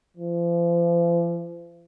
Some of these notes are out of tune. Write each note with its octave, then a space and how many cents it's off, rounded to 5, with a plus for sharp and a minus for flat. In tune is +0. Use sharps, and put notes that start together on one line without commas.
F3 -40